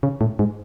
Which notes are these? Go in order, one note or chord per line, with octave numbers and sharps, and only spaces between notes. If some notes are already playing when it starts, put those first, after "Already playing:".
C#3
A2
G#2